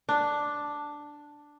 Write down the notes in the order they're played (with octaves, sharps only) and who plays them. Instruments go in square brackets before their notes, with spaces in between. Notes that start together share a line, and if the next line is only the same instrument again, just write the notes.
[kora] D4